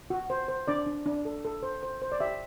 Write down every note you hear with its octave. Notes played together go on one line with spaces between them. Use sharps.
F#4
C5
C5
D4 D5
D4
D4
A4
A4
C5
C5
C5
D5
G4 E5